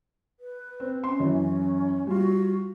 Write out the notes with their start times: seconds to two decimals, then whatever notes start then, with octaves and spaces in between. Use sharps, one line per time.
0.40 B4
0.80 C4
1.04 C#4 C6
1.20 F#2 E3
2.07 G3 F4 F#4